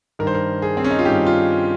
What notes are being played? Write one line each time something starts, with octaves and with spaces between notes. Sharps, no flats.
G2 D#3 A#4
C5
A#4
G#4
C4
C#4
D#4
F4
G2 D#3 G4
F4